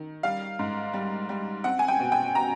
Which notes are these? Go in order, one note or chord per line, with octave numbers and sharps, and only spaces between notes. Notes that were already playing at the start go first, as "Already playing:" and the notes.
Already playing: D#3
G3 F5
G#2
G3
G3
C4 F#5
G#5
G5
B2
G5
B2 A#5